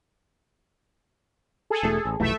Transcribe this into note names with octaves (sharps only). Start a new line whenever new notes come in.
G#4 A4
E1 E2 A3
A1
F1 B1 E3 A3 E5